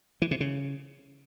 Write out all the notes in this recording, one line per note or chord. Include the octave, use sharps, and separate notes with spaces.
E3
C3
C#3